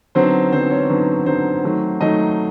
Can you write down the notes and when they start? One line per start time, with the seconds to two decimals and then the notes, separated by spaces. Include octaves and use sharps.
0.15 D3 F#3 B3 C4 D#4 C5
0.53 D3 F#3 B3 C4 D#4 C5
0.70 C#4 C#5
0.90 D3 F#3 B3 D#4
1.26 D3 F#3 B3 C4 D#4 C5
1.64 D#3 F#3 A3
2.01 D#3 F#3 A3 D#4 D#5